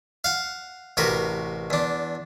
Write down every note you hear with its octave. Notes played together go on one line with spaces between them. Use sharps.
F5 F#5
A1 C3 F#4 A#4 B4
E2 D4